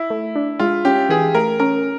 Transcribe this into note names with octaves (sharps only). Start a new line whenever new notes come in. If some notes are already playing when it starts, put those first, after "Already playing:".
Already playing: E4
A3
D4
G#3 F4
C#4 G4
E3 G#4
A3 A#4
C#4 A#4